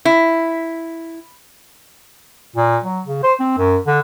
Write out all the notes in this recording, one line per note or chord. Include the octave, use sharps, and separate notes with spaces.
E4
A#2
F#3
C#3
C5
C4
F#2
D3